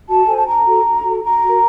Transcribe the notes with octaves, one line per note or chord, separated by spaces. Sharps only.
F#4 A5
A4 C5 G#5
A5
D4 A#5
F#4 A4
D4
F#4 A4
D4 A#5
F#4 A#4